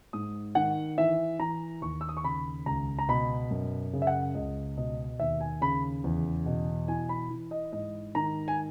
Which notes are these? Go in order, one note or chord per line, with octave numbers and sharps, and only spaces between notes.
G#2 D#6
D#3 F#5
E3 E5
E3 A#5
D#2 C#6
E6
D#6
C#6
C#3 B5
C#2 A#5
A#5
B2 B5
F#2
C#3
E5
F#5
C#2 D#5
B2 D#5
D#2 E5
G#5
C#3 B5
E2
B2
E3 G#5
B5
E3
D#5
G#2 D#5
D#3 A#5
G#5